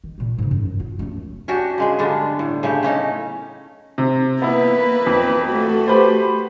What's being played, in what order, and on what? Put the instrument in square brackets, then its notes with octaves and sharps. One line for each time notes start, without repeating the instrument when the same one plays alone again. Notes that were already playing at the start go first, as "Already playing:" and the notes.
[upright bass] D#3
A#2 A#3
G#2 C#3
F#2
F4
F#2 A3
[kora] C#4 D4 F#4 G4
C#3 G#3 G#4
G2 D3 B3 D4
A2
C#3 A3 G4
C#3 C#4 D#4
[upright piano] C3
[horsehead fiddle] A#3 B4 [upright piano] B3 E4
[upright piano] F2
[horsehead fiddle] A3 F#4
[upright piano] G4 B4 C5